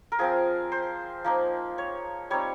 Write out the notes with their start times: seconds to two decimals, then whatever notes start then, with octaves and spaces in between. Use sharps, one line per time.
0.12 A#4
0.19 F3 C4 F4 G#4
0.72 C5
1.24 F3 A#3 D#4
1.78 C#5
2.30 G3 C4 D#4 C#5